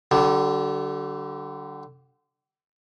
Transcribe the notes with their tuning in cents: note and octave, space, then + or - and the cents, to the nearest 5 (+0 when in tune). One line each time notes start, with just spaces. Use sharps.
D3 +0 G3 -45